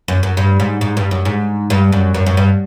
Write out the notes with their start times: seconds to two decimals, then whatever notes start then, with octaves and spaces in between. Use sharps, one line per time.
0.08 F#2
0.23 F#2
0.37 G2
0.60 G#2
0.81 G#2
0.97 G2
1.11 F#2
1.25 G#2
1.70 G2
1.92 F#2
2.14 F#2
2.26 F#2
2.37 G2